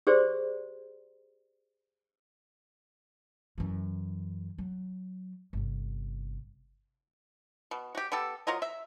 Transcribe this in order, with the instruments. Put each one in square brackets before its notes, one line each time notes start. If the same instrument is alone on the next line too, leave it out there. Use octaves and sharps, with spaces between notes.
[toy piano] G4 G#4 C5 D5 C6
[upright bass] F#2 E3
F#3
G1 C3
[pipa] B2
F#4 G4
B3 G4 A4
F#3 F4 A#4 D#5
E5